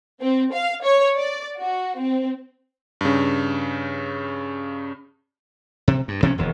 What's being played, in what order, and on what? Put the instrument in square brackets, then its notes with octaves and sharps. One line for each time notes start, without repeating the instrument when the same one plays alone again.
[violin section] C4
F5
C#5
D5
F#4
C4
[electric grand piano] G2 C#3
[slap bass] C3
G2
C3 F3 C4 C#4
E1 D#2